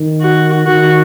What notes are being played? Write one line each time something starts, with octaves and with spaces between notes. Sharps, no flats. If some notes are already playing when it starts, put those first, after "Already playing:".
Already playing: D#3
F#4
D#3 F#4